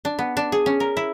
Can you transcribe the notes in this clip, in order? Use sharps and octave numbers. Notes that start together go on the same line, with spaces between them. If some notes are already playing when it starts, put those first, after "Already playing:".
D4
B3
D4
G#4
C#4
A#4
E4